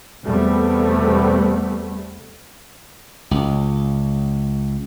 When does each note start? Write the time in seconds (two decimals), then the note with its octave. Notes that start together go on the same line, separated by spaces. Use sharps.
0.24 E2 C3 G3 A3 B3
3.31 C#2